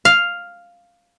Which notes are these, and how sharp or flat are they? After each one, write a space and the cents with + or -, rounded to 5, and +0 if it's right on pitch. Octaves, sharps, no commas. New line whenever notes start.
F5 +0